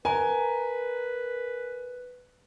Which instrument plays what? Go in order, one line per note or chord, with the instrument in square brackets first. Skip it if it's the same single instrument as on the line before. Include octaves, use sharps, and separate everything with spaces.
[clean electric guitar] A#4 [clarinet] B4 [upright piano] G#5